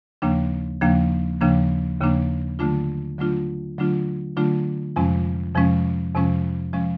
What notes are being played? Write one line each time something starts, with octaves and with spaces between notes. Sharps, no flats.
D#2 C#3 F3 A#3 D4
D#2 C#3 F3 A#3 D4
D#2 C#3 F3 A#3 D4
D#2 C#3 F3 A#3 D4
D3 F#3 A3 D4 F4
D3 F#3 A3 D4 F4
D3 F#3 A3 D4 F4
D3 F#3 A3 D4 F4
F2 C3 F3 G#3 C#4
F2 C3 F3 G#3 C#4
F2 C3 F3 G#3 C#4
C3 F3 G#3 C#4